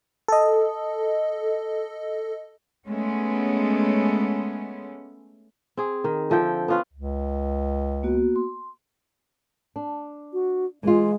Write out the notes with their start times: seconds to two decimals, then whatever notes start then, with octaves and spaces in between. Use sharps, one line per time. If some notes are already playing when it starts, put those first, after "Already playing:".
0.28 A4 D#5
2.86 G#3 A3 B3 C#4
5.77 C4 G#4
6.04 D#3
6.30 D3 F3 E5 G5
6.68 B3 C#4 F4 B4
6.93 C#2
8.03 A#3 B3 F#4
8.36 C6
9.76 D4
10.33 F#4
10.83 E3 G#3 F4